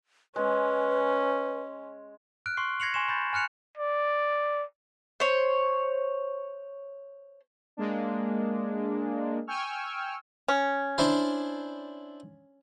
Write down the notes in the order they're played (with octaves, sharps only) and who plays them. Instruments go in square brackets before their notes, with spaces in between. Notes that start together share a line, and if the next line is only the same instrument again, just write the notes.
[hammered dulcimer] G#3 [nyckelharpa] C#4 [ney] B4
[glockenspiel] F6 F#6 D7
C6 C#6 C7
G#6 A#6 C7 C#7 F7 F#7
G#5 C6 C#6 E7
B5 G6 A6
G#5 F6 F#6 C#7 F7
[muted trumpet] D5
[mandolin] C5 C#5
[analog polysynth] G#3 A#3 D4
G5 G#5 C#6 E6 F6
[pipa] C#4
[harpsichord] D4 E4 C5